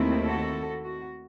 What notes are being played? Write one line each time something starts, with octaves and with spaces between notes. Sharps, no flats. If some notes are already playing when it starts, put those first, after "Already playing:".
Already playing: D#2 D#3 A3 C4 E4
F#4 A4
F#4